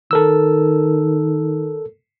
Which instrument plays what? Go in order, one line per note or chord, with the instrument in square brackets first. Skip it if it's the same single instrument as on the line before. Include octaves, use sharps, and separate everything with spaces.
[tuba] D#3 [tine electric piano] A4 A#4 E6